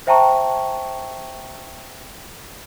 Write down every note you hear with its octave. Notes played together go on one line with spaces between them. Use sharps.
C5 E5 G5 A5 A#5 C#6